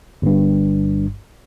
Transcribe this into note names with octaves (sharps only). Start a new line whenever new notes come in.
G1 G2